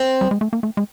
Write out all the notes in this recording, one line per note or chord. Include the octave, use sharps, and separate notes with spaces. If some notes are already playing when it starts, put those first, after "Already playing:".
Already playing: C4
G3
G#3
A3
A#3
A3
G#3